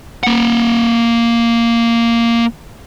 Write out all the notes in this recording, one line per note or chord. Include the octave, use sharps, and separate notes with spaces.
A#3 F#5